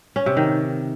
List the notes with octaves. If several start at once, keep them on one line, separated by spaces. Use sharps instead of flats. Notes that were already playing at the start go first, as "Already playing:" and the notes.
C#4
C3
D#3